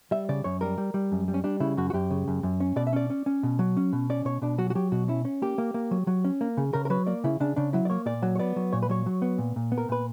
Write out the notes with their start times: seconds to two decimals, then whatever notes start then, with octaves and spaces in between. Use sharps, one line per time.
0.11 G3 E5
0.29 C#3 D5
0.44 F#2 C#5
0.61 G3 A#4
0.78 G3
0.94 G3
1.12 F#2
1.28 G3
1.34 C#4
1.44 G3 D4
1.60 C#3 E4
1.77 F#2 F#4
1.90 F#4
1.93 F#2 G4
2.10 C#3
2.28 F#2
2.43 F#2
2.60 C#4
2.76 B2 D5
2.87 E5
2.93 C#4 D5
3.10 C#4
3.26 C#4
3.43 B2
3.59 F#3
3.77 C#4
3.93 B2
4.10 C#4 D5
4.25 B2 C#5
4.42 B2 D4
4.58 F#3 F#4
4.70 F#4
4.75 F#3 G4
4.92 B2 F#4
5.08 C#4 E4
5.25 C#4
5.42 A#3 G4
5.58 A#3
5.74 A#3
5.91 F#3
6.07 F#3
6.25 C#4
6.41 A#3
6.57 C#3
6.73 C#3 A#4
6.85 A#4
6.90 F#3 B4
7.07 A#3 D5
7.24 C#3 E4
7.40 C#3 D4
7.56 C#3 D4
7.73 F#3 E4
7.85 D5
7.90 A#3 C#5
8.06 A#2 D5
8.22 F#3
8.36 C#5
8.39 B3 D5
8.56 F#3
8.73 A#2 C#5
8.82 B4
8.89 F#3 C#5
9.06 F#3
9.22 B3
9.38 A#2
9.56 A#2
9.72 B3
9.78 A#4
9.89 A#2 B4